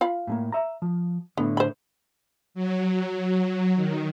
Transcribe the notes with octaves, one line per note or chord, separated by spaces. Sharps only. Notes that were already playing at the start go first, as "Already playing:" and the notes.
F4 F5 B5
A2 A3 A#3
E5 A#5
F3
A2 D3 B3
C5 B5
F#3
D#3